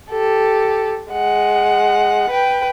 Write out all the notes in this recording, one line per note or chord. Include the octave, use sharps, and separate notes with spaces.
G4 A4
G#3 F#5
B4 G5